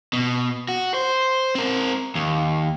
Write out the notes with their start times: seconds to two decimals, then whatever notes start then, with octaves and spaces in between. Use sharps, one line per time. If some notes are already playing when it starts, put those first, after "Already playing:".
0.13 B2
0.69 F#4
0.94 C5
1.55 C4 A#4
2.15 D#2